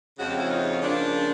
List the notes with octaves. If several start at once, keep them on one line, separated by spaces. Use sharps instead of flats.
F2 C#3 F3 G#3 C#4 F#4
G4
E4 F#4
D#4 F4
C#3 F3 A#3 D4